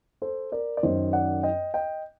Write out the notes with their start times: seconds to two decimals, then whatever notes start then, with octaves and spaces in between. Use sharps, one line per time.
0.22 A4 C5
0.52 A#4 D5
0.77 D5
0.83 F#2 D#3 C5 D#5
1.13 D5 F#5
1.43 D#5 G5
1.74 D#5 G5